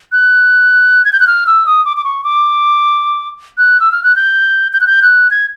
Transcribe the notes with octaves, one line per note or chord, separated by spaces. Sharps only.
F#6
G#6
G6
F#6
F6
E6
D#6
D6
D6
C#6
D6
F#6
E6
F6
F#6
G6
G6
F#6
G6
F#6
G#6